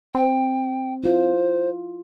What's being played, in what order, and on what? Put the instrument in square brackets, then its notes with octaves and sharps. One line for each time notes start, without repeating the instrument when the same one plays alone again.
[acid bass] C4 [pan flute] G5
[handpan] E4 F4 [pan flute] C5